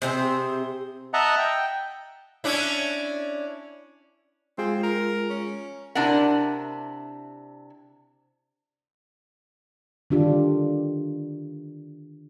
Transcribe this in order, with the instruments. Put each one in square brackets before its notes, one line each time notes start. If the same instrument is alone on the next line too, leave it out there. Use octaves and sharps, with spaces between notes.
[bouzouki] C3 C4 D4 G#4
[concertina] D#5 E5 F#5 A5 A#5
G5
[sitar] C#4 D4 E4
[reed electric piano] G#3 F4 G#4 [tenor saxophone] C4
[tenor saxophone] A#4
C#4
[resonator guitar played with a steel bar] C3 D4 E4 A#4 F#5
[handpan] D3 D#3 D4 F4 G4